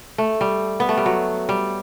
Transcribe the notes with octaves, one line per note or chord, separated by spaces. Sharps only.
A3
G3
B3
A3
G3
F#3
G3